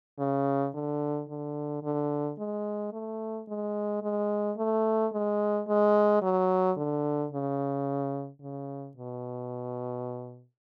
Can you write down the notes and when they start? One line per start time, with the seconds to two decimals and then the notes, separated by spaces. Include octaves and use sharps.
0.19 C#3
0.75 D3
1.29 D3
1.83 D3
2.39 G#3
2.93 A3
3.49 G#3
4.03 G#3
4.57 A3
5.13 G#3
5.68 G#3
6.22 F#3
6.77 D3
7.32 C#3
8.42 C#3
8.97 B2